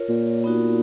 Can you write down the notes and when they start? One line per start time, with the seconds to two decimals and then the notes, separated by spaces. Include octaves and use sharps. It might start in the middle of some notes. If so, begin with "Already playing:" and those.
Already playing: F4 A#4 C#5
0.09 A#2
0.44 B3 D#4 F#4